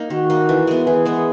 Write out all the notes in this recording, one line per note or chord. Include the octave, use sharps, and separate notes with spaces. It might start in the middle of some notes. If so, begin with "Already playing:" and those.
Already playing: A#3 D#4
D#3 F#4
A#3 D#4
E3
G#3 B3
E3 G#4
G#3 B3